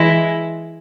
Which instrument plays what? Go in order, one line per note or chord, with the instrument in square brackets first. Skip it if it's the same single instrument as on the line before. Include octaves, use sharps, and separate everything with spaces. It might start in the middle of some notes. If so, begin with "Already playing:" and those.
Already playing: [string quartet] E3 G#3 E4